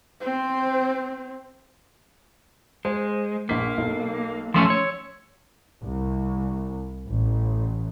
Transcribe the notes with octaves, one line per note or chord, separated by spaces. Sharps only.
C4 C5
G#3 C5
A#1 A#3 B6
B1
F3 A3 C#4 C6 E6
C#5
C2
A1